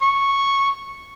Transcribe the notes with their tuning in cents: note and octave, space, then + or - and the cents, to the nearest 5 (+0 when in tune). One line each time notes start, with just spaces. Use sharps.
C#6 -5